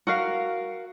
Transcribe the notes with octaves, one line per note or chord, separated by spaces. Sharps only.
F#4 A#4 F5